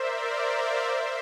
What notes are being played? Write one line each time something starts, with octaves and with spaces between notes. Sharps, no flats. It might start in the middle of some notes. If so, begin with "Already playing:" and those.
Already playing: A#4 C5 D5 E5
C5 E5
D5 F5
C5 E5